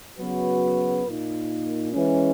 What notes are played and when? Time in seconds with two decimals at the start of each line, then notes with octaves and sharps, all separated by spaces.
0.19 C#3 F#3 B3 F#4 B4
1.06 A#2 A#3 D#4
1.93 E3 G#3 C#4